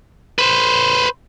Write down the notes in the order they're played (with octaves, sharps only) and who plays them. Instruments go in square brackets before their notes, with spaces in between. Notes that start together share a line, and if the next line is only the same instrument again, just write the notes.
[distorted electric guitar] B4 C5